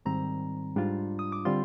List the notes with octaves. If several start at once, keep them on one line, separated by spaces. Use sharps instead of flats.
G#2 D#3 G3 C4 A#5
G#2 G3 D4 F4
D#6
D6
D3 G3 C4 F4 C6